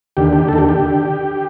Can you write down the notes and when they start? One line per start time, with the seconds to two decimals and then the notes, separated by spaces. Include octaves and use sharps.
0.17 D#2 D3 G4
0.33 G4
0.48 D#2 D3 A4
0.58 G4
0.69 G4
0.80 D3